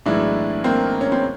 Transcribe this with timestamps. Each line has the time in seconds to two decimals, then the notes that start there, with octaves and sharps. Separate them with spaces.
0.06 B1 A2 E3 G#3 D4 E4
0.64 A#3 C4
1.01 C#4
1.12 C4